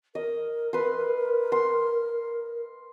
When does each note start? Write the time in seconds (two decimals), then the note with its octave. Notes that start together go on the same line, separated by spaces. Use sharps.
0.15 A#4 D#5
0.73 B4 C6
1.52 C6